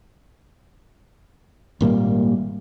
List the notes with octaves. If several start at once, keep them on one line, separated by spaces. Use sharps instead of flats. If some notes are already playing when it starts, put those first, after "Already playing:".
G#1 A#2 G3 A#3